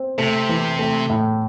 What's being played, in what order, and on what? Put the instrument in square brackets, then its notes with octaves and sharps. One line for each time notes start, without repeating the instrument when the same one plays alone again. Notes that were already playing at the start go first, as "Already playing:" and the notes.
Already playing: [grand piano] C4
[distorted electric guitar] C3 [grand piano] A3
[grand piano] E3
A3
A2